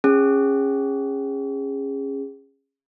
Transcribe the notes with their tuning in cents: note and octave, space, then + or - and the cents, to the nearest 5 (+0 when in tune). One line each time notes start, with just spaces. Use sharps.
C#4 -15 G#4 -20